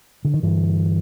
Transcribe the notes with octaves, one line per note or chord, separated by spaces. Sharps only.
D3
D#3
G2 D3 E3